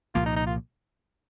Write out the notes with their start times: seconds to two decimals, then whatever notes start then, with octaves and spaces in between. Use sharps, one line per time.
0.15 C2 A#2 F3 A#3 F4
0.26 D#4
0.36 D#4
0.47 F4